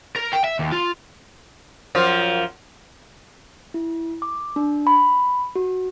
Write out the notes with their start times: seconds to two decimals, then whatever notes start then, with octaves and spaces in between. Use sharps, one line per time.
0.16 A#4
0.33 G5
0.44 E5
0.59 D#2
0.72 F4
1.95 F#2 F3 F4
3.74 E4
4.22 D6
4.56 D4
4.87 B5
5.55 F#4